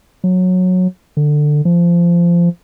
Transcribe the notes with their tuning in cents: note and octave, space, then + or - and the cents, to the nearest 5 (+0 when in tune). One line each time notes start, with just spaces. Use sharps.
F#3 -15
D3 +15
F3 -20